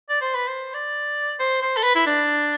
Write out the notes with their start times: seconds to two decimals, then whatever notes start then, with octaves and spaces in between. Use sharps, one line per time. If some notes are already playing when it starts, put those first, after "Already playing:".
0.09 D5
0.21 C5
0.34 B4
0.47 C5
0.74 D5
1.39 C5
1.62 C5
1.77 A4
1.83 B4
1.95 E4
2.06 D4